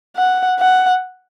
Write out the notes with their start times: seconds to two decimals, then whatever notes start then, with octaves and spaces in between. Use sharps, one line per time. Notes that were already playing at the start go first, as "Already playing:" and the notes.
0.17 F#5
0.59 F#5